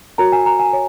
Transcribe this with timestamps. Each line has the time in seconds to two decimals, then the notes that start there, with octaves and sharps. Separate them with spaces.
0.18 F#4 A#4 C#5 A#5
0.32 G#5
0.46 A#5
0.60 G#5
0.73 C#5